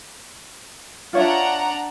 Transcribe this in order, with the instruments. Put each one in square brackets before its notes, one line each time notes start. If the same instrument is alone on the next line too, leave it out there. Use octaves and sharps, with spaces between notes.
[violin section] D4 F#5 A#5 [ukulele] F4 C#5 E5